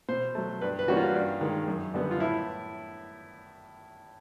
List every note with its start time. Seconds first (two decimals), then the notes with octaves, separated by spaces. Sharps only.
0.09 B2 C5
0.35 F#3 A3
0.61 G2 B4
0.79 B4
0.88 E3 G3 A#3 C#4 F#4
0.97 F4
1.14 G2
1.41 D#3 G#3
1.67 F#2
1.94 D3 G3 B3
2.11 F4
2.20 A2 E4